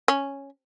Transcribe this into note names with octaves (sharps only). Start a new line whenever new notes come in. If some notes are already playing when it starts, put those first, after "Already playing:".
C#4